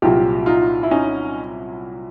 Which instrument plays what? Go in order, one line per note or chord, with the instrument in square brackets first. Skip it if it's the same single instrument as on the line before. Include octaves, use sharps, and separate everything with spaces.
[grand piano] C2 A#2 F#3 F4 G4
D#4 F4
E4
C#4 D#4